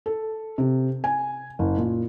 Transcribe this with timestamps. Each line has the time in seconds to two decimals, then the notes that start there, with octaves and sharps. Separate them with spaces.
0.06 A4
0.58 C3
1.04 G#5
1.59 F#1
1.78 A#2